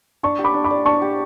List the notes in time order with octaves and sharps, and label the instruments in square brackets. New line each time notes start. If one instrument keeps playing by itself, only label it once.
[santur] D4 [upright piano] A5 C#6
[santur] G4
[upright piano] B5 D6
[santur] D4
[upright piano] B5 D6
[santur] D5
[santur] D4 [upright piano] A5 C#6
[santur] G4